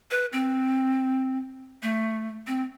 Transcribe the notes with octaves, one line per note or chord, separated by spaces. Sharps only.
B4
C4
A3
C4